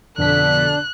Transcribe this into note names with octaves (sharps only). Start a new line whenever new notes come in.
F2 B2 D3 D4 A4 F#6 B6